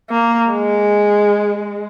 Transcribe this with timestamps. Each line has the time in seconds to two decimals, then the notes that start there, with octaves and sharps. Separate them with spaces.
0.11 A#3
0.50 G#3